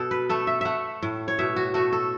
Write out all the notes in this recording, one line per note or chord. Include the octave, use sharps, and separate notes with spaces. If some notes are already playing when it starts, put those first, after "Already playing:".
Already playing: B2 A4
B4
A3 A4
E5
A3 E5 F#5
A2
C#5
B2 E5
F#4
A3 F#4
A4